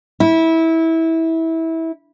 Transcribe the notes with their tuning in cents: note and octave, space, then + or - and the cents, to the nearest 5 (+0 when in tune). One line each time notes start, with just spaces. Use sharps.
E4 -20